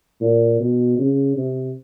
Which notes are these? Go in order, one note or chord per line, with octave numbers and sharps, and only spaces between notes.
A#2
B2
C#3
C3